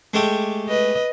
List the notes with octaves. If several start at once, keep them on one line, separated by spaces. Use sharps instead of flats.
G#3 A3 G4
B4 D#5